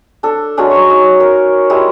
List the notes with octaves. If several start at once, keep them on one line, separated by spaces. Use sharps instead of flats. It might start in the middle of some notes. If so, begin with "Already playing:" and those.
D4 A4
F#3 G#3 C#4 D4
C#5 A#5 C#6
D#4
A#4
G3 G#3 E4